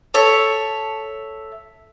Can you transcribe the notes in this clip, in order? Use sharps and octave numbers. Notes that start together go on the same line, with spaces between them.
A4 C#5 E5